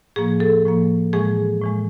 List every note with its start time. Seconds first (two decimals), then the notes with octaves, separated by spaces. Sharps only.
0.16 A2 F3 A#3 G#4
0.40 A4
0.65 A2 F3 A#3
1.13 A2 E3 G#3 G#4
1.62 A2 E3 G#3